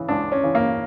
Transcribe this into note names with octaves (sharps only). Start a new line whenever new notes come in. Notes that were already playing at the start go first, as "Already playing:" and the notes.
Already playing: C#3 E3
C#2 D4
C#4
C#3 E3
A#3